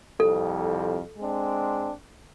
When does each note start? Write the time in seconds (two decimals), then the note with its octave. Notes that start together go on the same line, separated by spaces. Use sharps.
0.20 C2 F2 A4
1.17 G#3 C4 D4